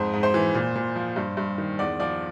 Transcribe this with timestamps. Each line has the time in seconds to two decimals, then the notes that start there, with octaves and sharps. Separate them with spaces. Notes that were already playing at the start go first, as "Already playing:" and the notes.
Already playing: F2 G#2 C5
0.13 G#2
0.23 C5
0.34 E3
0.54 A#2
0.76 A#2
0.96 F3
1.16 G2
1.37 G2
1.58 D#3
1.79 E2 D5
2.00 F3 D5